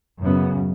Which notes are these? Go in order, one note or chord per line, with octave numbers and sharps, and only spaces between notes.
F#2 C#3 B3